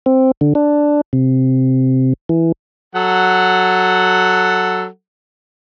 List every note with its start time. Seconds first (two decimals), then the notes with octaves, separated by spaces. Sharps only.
0.06 C4
0.41 D3
0.55 D4
1.13 C3
2.29 E3
2.95 F#3 A4 F#5